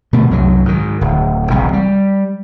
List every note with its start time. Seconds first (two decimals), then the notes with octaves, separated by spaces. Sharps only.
0.13 B2 D3 A3
0.31 C2 F#2 F#3
0.65 G#2 D#3
1.01 D1
1.50 E1 C2 C3
1.73 G3